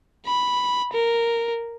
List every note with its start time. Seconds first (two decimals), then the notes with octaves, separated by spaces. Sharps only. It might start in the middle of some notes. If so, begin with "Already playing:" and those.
0.26 B5
0.93 A#4